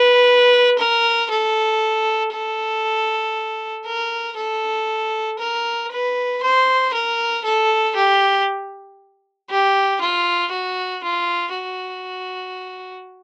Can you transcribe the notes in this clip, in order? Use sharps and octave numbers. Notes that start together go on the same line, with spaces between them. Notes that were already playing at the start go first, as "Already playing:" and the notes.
Already playing: B4
A#4
A4
A4
A#4
A4
A#4
B4
C5
A#4
A4
G4
G4
F4
F#4
F4
F#4